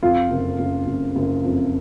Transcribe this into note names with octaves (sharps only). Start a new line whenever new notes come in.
F2 F4
F#1
F#1
F#1
F#1
F2